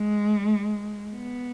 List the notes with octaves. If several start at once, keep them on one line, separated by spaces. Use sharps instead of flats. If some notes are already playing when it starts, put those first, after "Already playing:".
Already playing: G#3
B3